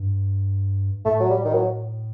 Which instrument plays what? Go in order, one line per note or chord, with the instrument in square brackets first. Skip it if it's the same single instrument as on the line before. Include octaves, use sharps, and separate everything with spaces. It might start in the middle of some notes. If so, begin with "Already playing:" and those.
Already playing: [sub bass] G2
[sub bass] A2 [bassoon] A3
[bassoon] F#3
G3
D#3
F#3